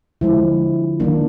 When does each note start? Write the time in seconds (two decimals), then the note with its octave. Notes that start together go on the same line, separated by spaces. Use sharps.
0.21 D3 F3 G#3 E4
1.00 D#3 F#3 A#3 D4